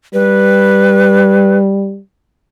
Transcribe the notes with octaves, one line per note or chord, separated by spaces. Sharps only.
G3 B4